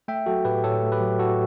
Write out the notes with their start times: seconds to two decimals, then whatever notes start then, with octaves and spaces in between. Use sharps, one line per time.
0.08 A3 E5 G5
0.26 F#3 F#4 A4
0.45 A2 G4 B4
0.64 A2 A4 C#5
0.82 A3
0.92 G4 B4
1.01 F#3
1.19 A2 F#4 A4